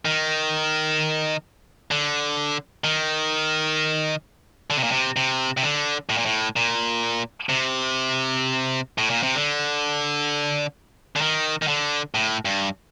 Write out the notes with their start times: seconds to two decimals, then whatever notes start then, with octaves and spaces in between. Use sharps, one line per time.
0.05 D#3
1.91 D3
2.84 D#3
4.70 D3
4.77 C3
4.84 A#2
4.91 C3
5.16 C3
5.57 C3
5.63 D3
6.09 A2
6.18 A#2
6.26 A2
6.56 A#2
7.49 C3
8.98 A2
9.10 A#2
9.23 C3
9.35 D3
11.16 D3
11.21 D#3
11.62 D#3
11.68 D3
12.14 A2
12.45 G2